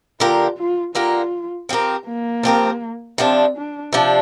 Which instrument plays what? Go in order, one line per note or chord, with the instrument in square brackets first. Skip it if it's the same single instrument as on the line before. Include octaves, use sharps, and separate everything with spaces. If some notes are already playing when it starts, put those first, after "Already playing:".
[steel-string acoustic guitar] D3 A#3 G4 A#4 [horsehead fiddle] F4
[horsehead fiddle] F4
[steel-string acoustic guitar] D3 A#3 G4 A#4 [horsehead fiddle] F4
[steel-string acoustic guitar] F3 C4 G4 A#4
[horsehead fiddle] A#3
[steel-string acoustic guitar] F3 C4 G4 A#4
[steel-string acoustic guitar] C3 F3 D4 [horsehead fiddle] C4
[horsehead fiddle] D4
[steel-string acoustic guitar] C3 F3 D4